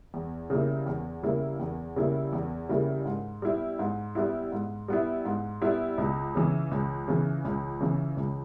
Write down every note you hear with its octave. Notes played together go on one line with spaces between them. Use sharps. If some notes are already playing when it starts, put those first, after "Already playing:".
E2
C#3 G3 A#3 E4
E2
C#3 G3 A#3 E4
E2
C#3 G3 A#3 E4
E2
C#3 G3 A#3 E4
G#2
G3 B3 E4
G#2
G3 B3 E4
G#2
G3 B3 E4
G#2
G3 B3 E4
C#2
C#3 E3
C#2
C#3 E3
C#2
C#3 E3
C#2